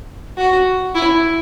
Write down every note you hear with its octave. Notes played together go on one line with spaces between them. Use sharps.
F#4
E4